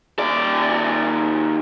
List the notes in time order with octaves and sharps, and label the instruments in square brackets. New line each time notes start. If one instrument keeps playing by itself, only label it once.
[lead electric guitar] D#2 D5